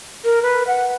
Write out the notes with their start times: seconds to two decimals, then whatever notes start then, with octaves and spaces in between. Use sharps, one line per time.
0.24 A#4
0.43 B4
0.67 F#5